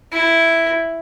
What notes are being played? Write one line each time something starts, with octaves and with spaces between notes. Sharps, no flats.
E4